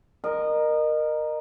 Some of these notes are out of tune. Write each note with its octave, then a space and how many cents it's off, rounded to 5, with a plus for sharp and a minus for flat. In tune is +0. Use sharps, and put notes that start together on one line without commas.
A#4 +0 D#5 -30